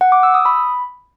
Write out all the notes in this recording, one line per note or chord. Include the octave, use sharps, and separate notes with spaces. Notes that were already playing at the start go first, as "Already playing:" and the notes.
F#5
D6
E6
D#6
B5